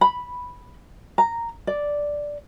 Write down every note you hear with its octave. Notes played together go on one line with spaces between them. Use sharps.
B5
A#5
D5